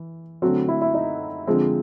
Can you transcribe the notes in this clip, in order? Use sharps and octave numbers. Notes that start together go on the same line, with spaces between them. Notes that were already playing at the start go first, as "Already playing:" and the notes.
Already playing: E3
D3 F#3 A3 C4 F#4
E4
E4
D#4
D3 F3 G#3 C4